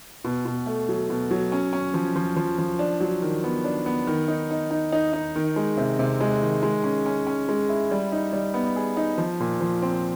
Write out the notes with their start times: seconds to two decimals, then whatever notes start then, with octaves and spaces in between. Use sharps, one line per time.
0.24 B2
0.45 B2
0.66 A3
0.89 F#3
1.10 B2
1.31 F#3
1.52 C#4
1.73 C#4
1.94 F3
2.15 F3
2.36 F3
2.58 F3
2.79 D4
3.01 F#3
3.22 D#3
3.44 B3
3.64 D4
3.86 B3
4.07 D#3
4.28 D#4
4.51 D#4
4.71 D#4
4.92 D#4
5.13 D#4
5.36 D#3
5.56 G#3
5.77 C3
5.99 C3
6.21 G#3
6.42 D#3
6.63 G#3
6.84 C#4
7.06 C#4
7.27 C#4
7.49 G#3
7.69 E4
7.91 G3
8.12 D#4
8.33 G3
8.54 B3
8.76 G#4
8.97 D#4
9.18 F3
9.40 A#2
9.61 F3
9.82 C4